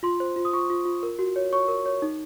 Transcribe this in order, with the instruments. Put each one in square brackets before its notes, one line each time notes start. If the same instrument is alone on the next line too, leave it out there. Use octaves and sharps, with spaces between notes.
[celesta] F4 C6
C5
F4
D#6
F4 C#6
F4
F4
A#4
F#4
C#5
C#5 C#6
A#4
C#5
D#4